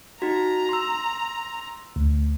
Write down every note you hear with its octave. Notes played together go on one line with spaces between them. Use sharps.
D#4 F#4 A#5
C6 E6
D2